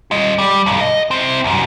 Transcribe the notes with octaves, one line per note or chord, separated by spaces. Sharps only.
F4 D#5
G3
B1 G2
D#5
C4 E4
C2 F#2